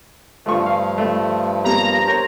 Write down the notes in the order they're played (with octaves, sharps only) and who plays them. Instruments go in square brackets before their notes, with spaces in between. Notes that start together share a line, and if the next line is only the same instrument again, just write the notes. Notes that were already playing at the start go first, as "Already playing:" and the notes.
[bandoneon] G2 F3 [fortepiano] A3 F4 C#6
[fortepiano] F5
A3
[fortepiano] G3 A#3 [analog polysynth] A#5
[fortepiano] A#4 C#5 [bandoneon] C5